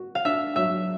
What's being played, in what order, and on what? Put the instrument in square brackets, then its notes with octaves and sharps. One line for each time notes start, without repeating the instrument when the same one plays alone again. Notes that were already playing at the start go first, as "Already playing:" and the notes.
Already playing: [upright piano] F#4
[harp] F5
[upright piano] D4 [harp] E5
[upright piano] F#3 [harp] E5